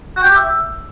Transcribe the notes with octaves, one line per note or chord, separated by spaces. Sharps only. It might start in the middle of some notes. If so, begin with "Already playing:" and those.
F#4
G5
G4
E5